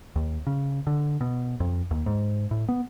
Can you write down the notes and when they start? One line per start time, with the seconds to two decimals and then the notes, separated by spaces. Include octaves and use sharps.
0.16 D#2
0.47 C#3
0.87 D3
1.21 B2
1.60 F2
1.91 D#2
2.06 G#2
2.51 A2
2.69 B3